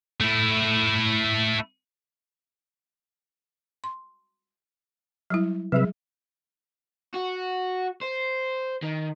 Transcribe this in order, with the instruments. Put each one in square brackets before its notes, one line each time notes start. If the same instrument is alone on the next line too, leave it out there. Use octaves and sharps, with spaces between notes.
[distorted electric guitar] A3 E4
[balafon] C6
F#3 G3 E4
[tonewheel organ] C3 B4 E5 [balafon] F#3 G3 G#4
[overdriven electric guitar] F#4
C5
D#3